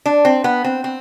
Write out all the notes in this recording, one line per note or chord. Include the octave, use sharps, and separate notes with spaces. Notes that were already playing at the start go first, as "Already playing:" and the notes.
D4
C4
B3
C4
C4